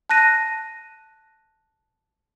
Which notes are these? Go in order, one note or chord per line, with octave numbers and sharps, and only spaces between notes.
A5 F#6 A#6 D#7